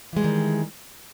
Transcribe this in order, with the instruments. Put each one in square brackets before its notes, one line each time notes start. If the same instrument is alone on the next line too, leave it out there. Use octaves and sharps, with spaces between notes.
[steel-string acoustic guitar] E3
G#3
G3
D#3